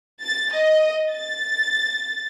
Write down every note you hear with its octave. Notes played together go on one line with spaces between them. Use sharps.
A6
D#5
A6